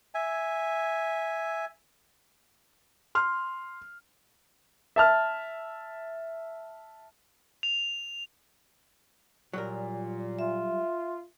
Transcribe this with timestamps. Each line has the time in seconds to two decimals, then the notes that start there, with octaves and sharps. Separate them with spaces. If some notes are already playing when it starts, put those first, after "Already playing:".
0.15 E5 G#5
3.15 C6 F6
4.96 E5 A5 F6
7.63 F7
9.53 A#2 F#3 G3 A#4
10.39 F4 E5